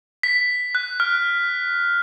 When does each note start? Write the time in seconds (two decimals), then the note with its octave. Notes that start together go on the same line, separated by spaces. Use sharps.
0.23 B6
0.75 F#6
1.00 F6